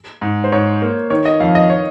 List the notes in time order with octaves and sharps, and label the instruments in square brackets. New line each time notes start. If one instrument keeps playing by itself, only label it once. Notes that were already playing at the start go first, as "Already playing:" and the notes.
[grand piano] G#2
[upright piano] C5
[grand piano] G#2 [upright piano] C#5
[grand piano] A#3
[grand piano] D#3 [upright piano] C#5
[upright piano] D#5
[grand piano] F2 [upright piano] F5
[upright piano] D#5
C#5